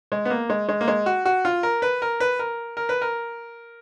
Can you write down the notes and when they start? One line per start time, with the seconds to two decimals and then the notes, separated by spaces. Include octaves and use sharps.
0.12 G#3
0.25 B3
0.30 A#3
0.50 G#3
0.69 G#3
0.81 A#3
0.88 G#3
1.06 F#4
1.25 F#4
1.45 F4
1.63 A#4
1.82 B4
2.02 A#4
2.20 B4
2.39 A#4
2.77 A#4
2.89 B4
3.02 A#4